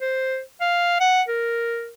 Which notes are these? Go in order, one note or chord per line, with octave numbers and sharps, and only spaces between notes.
C5
F5
F#5
A#4